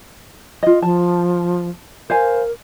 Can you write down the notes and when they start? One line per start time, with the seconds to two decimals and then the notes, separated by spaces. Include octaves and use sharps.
0.63 F4 D#5
0.82 F3 A5
2.10 A#4 C5 F5 G#5